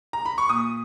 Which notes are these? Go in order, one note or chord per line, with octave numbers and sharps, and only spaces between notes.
A#5
B5
C#6
A#2 D#6